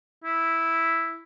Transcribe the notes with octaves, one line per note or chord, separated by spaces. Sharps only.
E4